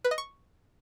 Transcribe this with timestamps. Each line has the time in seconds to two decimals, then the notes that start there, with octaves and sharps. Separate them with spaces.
0.04 B4
0.11 D#5
0.18 C#6